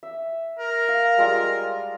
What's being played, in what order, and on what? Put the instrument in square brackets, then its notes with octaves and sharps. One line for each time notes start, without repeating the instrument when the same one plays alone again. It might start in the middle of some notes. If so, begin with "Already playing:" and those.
[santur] E5
[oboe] A#4
[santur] F5
G3 G#3 F4